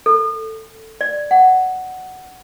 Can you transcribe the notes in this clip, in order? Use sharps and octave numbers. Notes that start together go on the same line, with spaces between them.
A4
D5
F#5